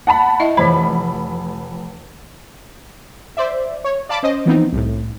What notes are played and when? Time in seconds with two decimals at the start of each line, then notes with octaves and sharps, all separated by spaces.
0.07 F#5 A5 B5
0.40 E4 D#5 E5
0.57 F1 E3 C5 B5
3.37 C5 D5 E5
3.84 C#5
4.09 D5 F5 A5 B5 D6
4.23 C#4 C5 D#5
4.46 E3 F3 B3 C4 D#4
4.73 C2 A2